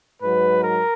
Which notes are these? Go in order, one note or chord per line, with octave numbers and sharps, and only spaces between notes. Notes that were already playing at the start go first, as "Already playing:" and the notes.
G#2 F#3 B4
A#4